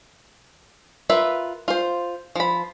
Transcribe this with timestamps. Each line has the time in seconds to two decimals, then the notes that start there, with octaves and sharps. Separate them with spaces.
1.10 F4 A#4 B4 E5
1.68 F4 C5
2.36 F3 B5